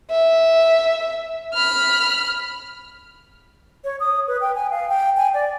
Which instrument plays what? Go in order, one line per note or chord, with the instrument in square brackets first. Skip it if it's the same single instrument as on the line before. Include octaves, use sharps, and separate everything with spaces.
[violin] E5
B5 F6
[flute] C#5
D#6
B4
G5
G#5
F5
G5
G#5
D5